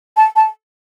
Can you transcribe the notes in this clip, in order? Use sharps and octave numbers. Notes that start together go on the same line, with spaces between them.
A5
A5